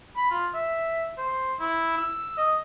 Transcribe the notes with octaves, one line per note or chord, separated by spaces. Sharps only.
B5
F4
E5
C5
E4
E6
D#5